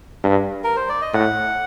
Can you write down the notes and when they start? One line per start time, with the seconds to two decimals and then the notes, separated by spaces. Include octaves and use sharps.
0.24 G2
0.64 A#4
0.76 C5
0.89 D5
1.02 D#5
1.14 A2 F#5